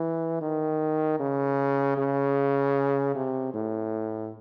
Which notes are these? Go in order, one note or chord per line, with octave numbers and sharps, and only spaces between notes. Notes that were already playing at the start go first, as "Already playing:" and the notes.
Already playing: E3
D#3
C#3
C#3
C3
A2